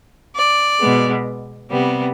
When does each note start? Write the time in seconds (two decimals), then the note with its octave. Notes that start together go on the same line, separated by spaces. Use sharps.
0.34 D5
0.80 B2 G#3 B3
1.70 C3 G3 B3